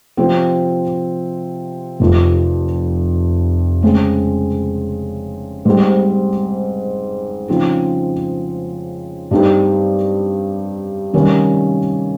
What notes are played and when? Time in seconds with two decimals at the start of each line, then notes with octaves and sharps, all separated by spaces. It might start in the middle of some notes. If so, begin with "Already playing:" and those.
0.17 C3 F3 C4
2.00 F1 F2 C3 F3
3.82 C#3 G#3 C4
5.65 G#2 G3 C4
7.48 C#3 F3 C4 D#4
9.31 G2 G3 C4 D#4 G4
11.13 C3 D#3 G3 A#3 C#4